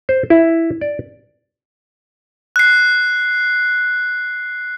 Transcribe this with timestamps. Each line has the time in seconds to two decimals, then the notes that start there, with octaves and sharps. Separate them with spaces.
0.09 C5
0.30 E4
0.81 D5
2.56 F#6 C7